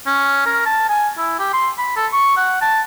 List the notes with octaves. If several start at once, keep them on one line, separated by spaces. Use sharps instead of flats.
C#4
A#4
A5
G#5
E4
G4
C6
B5
A4
C#6
F#5
A5